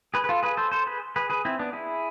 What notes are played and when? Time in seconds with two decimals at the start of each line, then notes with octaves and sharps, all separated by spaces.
0.14 G#4 B4
0.24 B4
0.29 F4 A4
0.43 G#4 B4
0.57 A4 C5
0.72 A4 C5
0.87 G#4 B4
1.16 G#4 B4
1.30 G#4 B4
1.45 C4 E4
1.59 B3 D4
1.73 E4 G#4